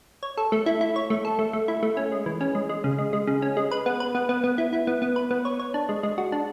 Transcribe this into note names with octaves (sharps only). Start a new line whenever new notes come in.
C#5
A4
A3
E4
E4
C#5
A3
A4
A3
A3
E4
A3
C#4
G#3
E3
C#4
G#3
G#3
C#3
G#3
G#3
C#3
C#4
G#3
B4
B3
B4
B3
B3
B3
E4
E4
B3
B3
B4
B3
C#5
C#5
D4
G#3
G#3
F#4
D4